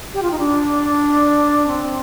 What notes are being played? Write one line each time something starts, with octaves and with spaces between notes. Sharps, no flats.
G4
F4
D#4
D4
C4